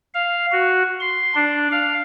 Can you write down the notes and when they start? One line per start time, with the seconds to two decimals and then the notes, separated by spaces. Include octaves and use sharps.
0.14 F5
0.52 F#4
1.01 C6
1.34 D4
1.71 F5